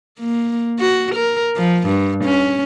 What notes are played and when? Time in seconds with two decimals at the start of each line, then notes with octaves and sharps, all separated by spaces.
0.20 A#3
0.80 F#4
1.15 A#4
1.56 F3
1.87 G2
2.24 C#4